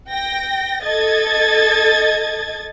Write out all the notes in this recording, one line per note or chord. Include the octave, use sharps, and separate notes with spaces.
G5 A#6
A4 D#5 G#6 A6